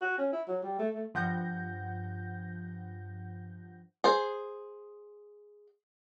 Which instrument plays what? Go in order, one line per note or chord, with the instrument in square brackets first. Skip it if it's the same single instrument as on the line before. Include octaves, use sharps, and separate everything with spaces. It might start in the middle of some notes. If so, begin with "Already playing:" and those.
[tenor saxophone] F#4
C#4
E4
F#3
G3
A3
A3
[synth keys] G2 F3 F#5 G6 A#6
[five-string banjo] G#4 C5